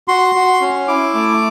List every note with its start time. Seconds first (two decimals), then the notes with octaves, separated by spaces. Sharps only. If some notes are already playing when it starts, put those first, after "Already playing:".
0.08 F#4 C6
0.35 F#4
0.61 C#4
0.88 E4 D6
1.14 A3